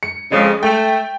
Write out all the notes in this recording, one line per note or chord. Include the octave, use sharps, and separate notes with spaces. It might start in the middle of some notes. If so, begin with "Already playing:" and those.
C#7
F2 C#3 G#3
A3 G5